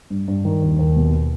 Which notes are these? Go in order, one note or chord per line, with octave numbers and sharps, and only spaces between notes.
G2
G2
D#3
D#2
D#2
B2